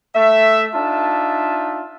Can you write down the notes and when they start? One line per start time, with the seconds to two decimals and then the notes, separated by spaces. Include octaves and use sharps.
0.15 A3 E5
0.75 D4 D#4 F4 E5 A5